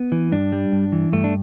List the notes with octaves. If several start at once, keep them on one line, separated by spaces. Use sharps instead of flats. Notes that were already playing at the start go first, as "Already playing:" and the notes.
Already playing: B3
E3
G2 D4
G3
G2
E3
G2 A3
D4